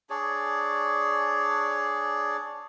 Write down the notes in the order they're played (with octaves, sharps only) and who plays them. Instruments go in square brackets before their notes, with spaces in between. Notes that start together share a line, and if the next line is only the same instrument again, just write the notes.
[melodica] D4 G#4 C#5 D5